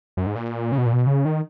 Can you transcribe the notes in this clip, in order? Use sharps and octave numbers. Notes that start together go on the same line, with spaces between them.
F#2
G#2
A#2
C#3
B2
A#2
B2
C#3
D#3